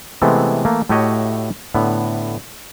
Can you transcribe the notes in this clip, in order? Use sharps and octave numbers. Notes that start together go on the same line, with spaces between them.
C3 E3 G#3 A3 B3 C4
E3 A3 A#3
A2 A3 F#4 G4 C#5 D#5
A2 D3 B3